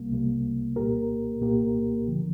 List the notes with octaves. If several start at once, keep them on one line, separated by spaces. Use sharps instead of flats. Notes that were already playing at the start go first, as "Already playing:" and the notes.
Already playing: C2 C3 G3 A#3
C2 C3 G3 A#3
C2 A#2 A#3 G4 A#4
C2 A#2 A#3 G4 A#4
D2 D3 F3